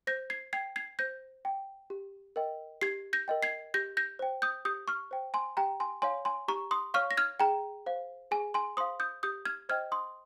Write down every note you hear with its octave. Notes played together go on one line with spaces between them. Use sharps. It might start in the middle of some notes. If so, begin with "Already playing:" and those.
C5 G6 A#6
G#6 C7
G5 G#6 C7
G#6 C7
C5 G6 A#6
G5
G4
A#4 D#5 G5
G4 G#6 C7
G6 A#6
A#4 D#5 G5
G#6 C7
G4 G6 A#6
G6 A#6
C5 G5
D#6 G6
G4 D#6 G6
C#6 F6
C5 G5
G#5 C6
G4 G5 A#5
G#5 C6
C#5 F5 G#5 C6
G#5 C6
G4 A#5 C#6
C6 D#6
C#5 F5 C#6 F6
A#6
F6 G#6
G#4 G5 A#5
C5 F5
G#4 G#5
G#5 C6
C5 F5 C6 D#6
D#6 G6
G4 D#6 G6
F6 G#6
C5 D#5 G5 F6 G#6
C6 D#6